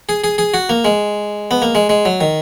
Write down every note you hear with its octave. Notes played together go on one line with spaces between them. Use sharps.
G#4
G#4
G#4
F#4
A#3
G#3
B3
A#3
G#3
G#3
F#3
D#3